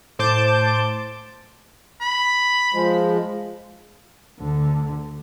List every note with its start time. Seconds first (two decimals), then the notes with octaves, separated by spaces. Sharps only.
0.19 A2 C5 A5 D6 G6 D7
2.01 B5
2.74 F3 G#3
4.40 D2 D3